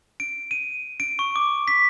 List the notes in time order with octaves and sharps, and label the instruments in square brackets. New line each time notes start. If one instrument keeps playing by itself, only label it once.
[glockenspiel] D7
D#7
D7
C#6
D6
B6